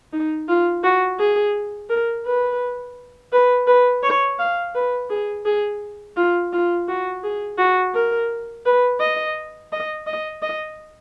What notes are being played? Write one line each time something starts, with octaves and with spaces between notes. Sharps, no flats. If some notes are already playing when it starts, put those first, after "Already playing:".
D#4
F4
F#4
G#4
A#4
B4
B4
B4
C#5
F5
B4
G#4
G#4
F4
F4
F#4
G#4
F#4
A#4
B4
D#5
D#5
D#5
D#5